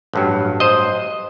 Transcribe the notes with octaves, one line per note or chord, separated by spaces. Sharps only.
A1 G2 F#3
C5 D#5